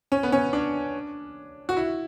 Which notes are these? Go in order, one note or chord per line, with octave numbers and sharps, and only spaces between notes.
C#4
B3
C#4
D4
F#4
E4